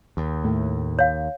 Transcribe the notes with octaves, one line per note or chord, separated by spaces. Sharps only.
D#2
A2
C#5 F5